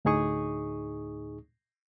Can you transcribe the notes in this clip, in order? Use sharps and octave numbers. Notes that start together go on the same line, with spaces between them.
D2 A2 D#4 G#4 C#6 D#6